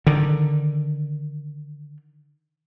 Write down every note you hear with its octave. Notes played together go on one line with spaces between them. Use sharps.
D3 D#3